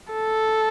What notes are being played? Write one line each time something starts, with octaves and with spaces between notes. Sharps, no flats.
A4